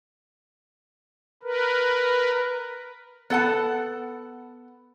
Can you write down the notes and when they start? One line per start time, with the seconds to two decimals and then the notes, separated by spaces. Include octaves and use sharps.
1.43 A#4 B4
3.30 B3 A4 F#5 A5